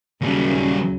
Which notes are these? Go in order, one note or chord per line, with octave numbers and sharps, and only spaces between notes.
D#2 A#2 C#3 F#3 G3